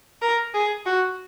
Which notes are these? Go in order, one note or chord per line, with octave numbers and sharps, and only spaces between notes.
A#4
G#4
F#4